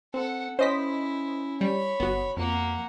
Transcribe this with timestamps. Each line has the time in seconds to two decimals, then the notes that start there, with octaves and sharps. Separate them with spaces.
0.14 C4 A4 F#5
0.59 C#4 E4 C5 D#5 B6
1.61 G3 C#5 B5
2.00 G1 B3 F#4
2.37 F2 A#3 F#5